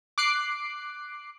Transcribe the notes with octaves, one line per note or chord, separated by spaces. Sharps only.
D6 F#6 C7 D7